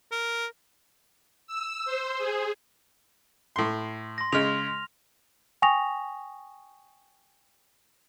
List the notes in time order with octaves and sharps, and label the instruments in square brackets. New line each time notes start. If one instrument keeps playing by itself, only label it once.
[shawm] A#4
[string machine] E6
C5
G#4
[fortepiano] A2 C6
[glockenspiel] C6 A#6
[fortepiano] C#3 G#3 [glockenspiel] F6 F7
[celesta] G5 G#5 C#6 D#6 A#6 F7